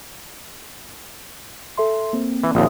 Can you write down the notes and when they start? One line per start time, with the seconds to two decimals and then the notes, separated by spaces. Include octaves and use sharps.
1.77 A4 E5 C6
2.13 A#3 C4
2.44 E3
2.55 A#1 D#2 E5 C6 D#6